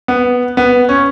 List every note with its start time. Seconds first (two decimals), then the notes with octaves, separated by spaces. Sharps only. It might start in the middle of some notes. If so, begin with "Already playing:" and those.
0.08 B3
0.57 B3
0.89 C#4